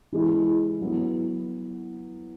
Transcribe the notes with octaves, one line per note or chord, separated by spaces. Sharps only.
E3 G#3 E4
F#3 B3 E4